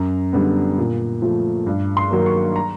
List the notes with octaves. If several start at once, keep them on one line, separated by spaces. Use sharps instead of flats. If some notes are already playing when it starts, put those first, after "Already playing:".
Already playing: F#2 A#5
D3 G3 B3
A#2
F3 A3
G2
C6
D#3 F#3 A#3
C#6
A#5